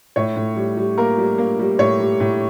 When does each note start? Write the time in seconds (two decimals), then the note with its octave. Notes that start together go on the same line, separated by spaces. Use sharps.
0.16 A2 C#5
0.36 A2
0.56 G3
0.77 G3
0.98 A#3 A#4
1.18 G3
1.38 A#3
1.59 G3
1.79 A2 C#5
2.00 G3
2.20 A2